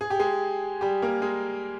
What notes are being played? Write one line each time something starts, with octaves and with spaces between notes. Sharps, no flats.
G#4
G4
G#3 G#4
G3 G4
A#3 A#4
G#3 G#4